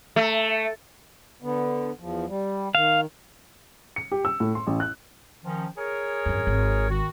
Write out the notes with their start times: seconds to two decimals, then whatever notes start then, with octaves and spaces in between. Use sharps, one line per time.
0.16 A3
1.42 D3 B3
2.00 E2 F3
2.28 G3
2.75 D#3 F5
3.96 C#7
4.12 G4
4.25 E6
4.40 A2
4.55 C6
4.67 A1
4.80 F#6
5.44 D#3 F3 C#4
5.78 G#4 A#4 C#5
6.26 G#1 F#2
6.47 G#1
6.89 D#3 F#4